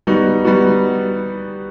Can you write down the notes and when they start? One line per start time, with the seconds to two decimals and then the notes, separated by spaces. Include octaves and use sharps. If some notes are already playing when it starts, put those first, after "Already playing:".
0.07 G3 B3 D#4 F#4
0.45 G3 B3 D#4 F#4